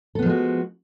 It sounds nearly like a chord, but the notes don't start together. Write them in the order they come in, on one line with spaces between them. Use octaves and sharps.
A4 B3 F3 G#3 F#4